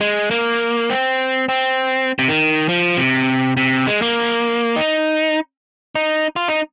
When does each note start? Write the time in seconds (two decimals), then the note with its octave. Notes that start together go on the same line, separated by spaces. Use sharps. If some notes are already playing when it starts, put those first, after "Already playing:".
0.01 G#3
0.31 A#3
0.90 C4
1.49 C4
2.19 C3
2.28 D#3
2.69 F3
2.97 C3
3.57 C3
3.87 G#3
4.02 A#3
4.76 D#4
5.95 D#4
6.36 F4
6.48 D#4